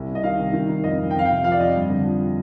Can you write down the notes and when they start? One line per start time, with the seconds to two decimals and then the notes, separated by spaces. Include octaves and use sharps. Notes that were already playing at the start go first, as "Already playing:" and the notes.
Already playing: C2
0.09 C3
0.15 D#5
0.23 D#3 F5
0.39 C2
0.53 D#3
0.69 D#3
0.84 F2 D#5
0.99 F2
1.11 G5
1.14 F2 F5
1.25 C3 G5
1.44 F3 F5
1.52 D5
1.59 F2 D#5
1.75 G2
1.89 D3
2.05 F3